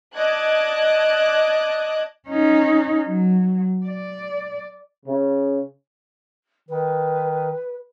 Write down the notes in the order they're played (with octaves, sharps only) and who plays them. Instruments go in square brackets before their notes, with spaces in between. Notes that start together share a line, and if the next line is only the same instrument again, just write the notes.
[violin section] D5 D#5 A5 D6 F#6 G#6
[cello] C#4 D#4
F#3
D5
[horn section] C#3
[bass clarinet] D#3 [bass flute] B4